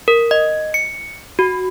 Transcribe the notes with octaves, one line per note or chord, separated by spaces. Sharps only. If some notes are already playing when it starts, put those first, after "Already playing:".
A#4
D#5
C#7
F#4